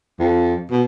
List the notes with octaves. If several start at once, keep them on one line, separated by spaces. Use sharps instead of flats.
F2
B2